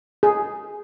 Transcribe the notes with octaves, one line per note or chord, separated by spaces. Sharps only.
G#4